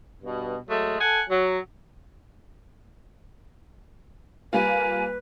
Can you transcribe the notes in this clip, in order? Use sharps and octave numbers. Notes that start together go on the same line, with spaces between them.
G2 B2
F#3 G#3 A3
A4 F#5 G#5
F#3
G3 A#3 F4 B4 G#5